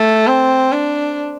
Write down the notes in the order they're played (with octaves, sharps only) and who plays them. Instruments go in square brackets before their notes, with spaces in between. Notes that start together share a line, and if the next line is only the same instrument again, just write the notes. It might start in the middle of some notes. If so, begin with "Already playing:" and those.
Already playing: [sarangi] A3
C4
D4